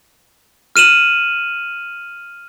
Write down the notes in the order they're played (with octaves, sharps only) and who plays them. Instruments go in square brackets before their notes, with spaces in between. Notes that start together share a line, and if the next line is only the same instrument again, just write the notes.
[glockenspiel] F6 D#7 E7 F#7